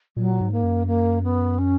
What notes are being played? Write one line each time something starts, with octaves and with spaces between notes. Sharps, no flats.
A#2 F#3
G#2
A#3
F#2
A#3
B3
C#4